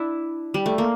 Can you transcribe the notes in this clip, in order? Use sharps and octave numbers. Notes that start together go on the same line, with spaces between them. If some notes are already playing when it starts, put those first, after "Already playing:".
Already playing: D4 E4
G3
A3
A#3